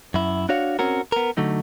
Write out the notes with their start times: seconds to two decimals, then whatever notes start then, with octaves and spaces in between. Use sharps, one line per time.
0.14 F#2 E4
0.49 D4 F#4 C#5 F5
0.79 C4 C#4 F#4 A#4
1.12 B3 A#4
1.37 D3 F#3 A3 D#4